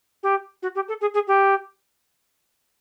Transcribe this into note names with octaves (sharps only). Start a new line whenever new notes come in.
G4
F#4
G4
A4
G#4
G#4
G4